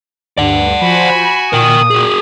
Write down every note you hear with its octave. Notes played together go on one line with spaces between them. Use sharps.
D2 G2 D5 F#5
F3 F#4 C5 G#5 B5
A#2 A#4 G5 D#6
F#4 G#4